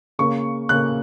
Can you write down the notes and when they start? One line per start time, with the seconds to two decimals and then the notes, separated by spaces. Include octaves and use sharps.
0.19 C#3 A#3 C#6
0.69 C#3 A#3 F#6